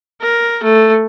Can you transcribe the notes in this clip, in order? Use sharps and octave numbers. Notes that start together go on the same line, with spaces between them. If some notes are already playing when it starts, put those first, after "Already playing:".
A#4
A3